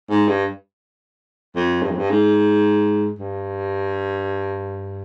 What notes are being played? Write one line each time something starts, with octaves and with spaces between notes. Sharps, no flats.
G#2
G2
F2
G2
F2
G2
G#2
G2